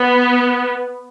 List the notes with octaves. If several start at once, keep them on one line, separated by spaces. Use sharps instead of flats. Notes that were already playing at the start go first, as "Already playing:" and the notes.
Already playing: B3